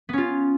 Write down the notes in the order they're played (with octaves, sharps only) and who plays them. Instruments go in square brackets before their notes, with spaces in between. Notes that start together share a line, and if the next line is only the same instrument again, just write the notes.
[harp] B3
C#4
F4